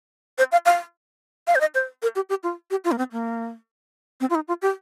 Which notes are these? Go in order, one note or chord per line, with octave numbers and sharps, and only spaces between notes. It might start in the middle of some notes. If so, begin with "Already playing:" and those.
C5
F5
F5
F5
C5
D#5
C5
A#4
G4
G4
F4
G4
F4
A#3
C4
A#3
C4
F4
D#4
F4
G4